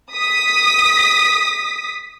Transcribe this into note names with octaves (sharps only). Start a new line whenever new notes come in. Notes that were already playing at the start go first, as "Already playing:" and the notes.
D#6 B6